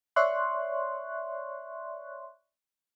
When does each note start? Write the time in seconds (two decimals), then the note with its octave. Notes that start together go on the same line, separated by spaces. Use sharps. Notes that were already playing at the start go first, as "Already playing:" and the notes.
0.16 C#5 D5 E5 C6 C#6 F#6